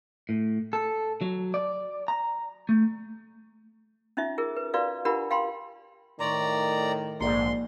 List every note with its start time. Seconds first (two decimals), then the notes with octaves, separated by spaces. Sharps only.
0.29 A2
0.73 A4
1.21 F#3
1.54 D5
2.08 A#5
2.69 A3
4.17 C#4 D#4 F4 E5
4.38 F4 G#4 A#4
4.57 B4
4.74 F4 F#4 B4 D5 F5
5.05 D4 F4 G4 A#4 F#5 B5
5.31 F5 G5 B5 C6
6.20 A2 D#3 D5 A#5 C6 C#6
7.21 A#1 G#2 A#3 D5 C6